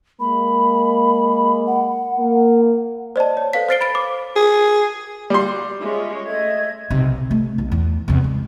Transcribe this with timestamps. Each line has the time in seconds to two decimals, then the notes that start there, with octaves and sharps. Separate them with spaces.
0.20 G#3 A#3 B5
1.67 F#5
2.18 A#3
3.16 C5 D5 D#5 A5
3.37 C#5
3.53 A4 B4 F5 B6
3.69 C5 F6 A6 C7 D7 G7
3.81 B5 A6 D7
3.95 D6
4.36 G#4
5.30 G3 F#4 C6
5.79 G#3 C#4 F4 C#5 E5
6.26 A3 D#5 E5 G#6
6.90 B1 C3
7.31 A3
7.58 B1
7.72 E2
8.08 E2 C3
8.24 G#3